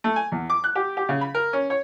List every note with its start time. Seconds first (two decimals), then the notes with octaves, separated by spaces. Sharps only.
0.04 A3
0.16 G#5
0.32 E2
0.50 D6
0.64 F#6
0.75 G4
0.97 G4
1.09 C#3
1.21 B5
1.34 A#4
1.53 C#4
1.70 C#5